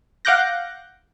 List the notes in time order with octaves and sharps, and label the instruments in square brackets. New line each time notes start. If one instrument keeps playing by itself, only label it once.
[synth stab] F5 F#5 D6 F#6 G6 A#6